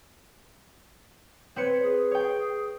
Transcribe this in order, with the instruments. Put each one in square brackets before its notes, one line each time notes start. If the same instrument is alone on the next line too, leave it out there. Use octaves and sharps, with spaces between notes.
[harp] C4 B4 C#7 [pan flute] C#5
[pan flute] G#4
[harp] C#5 G5